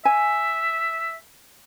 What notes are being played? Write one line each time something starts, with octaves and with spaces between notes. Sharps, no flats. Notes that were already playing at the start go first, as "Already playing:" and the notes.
E5 G#5